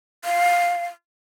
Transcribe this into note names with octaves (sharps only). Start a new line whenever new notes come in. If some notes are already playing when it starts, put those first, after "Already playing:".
F5